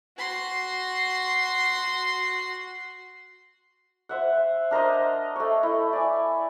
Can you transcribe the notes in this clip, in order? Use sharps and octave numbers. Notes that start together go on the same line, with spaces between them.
F#4 C6
C5 E5 F#5
D4 A#4 C5 D#5
A3 C#5
E4
D5 G#5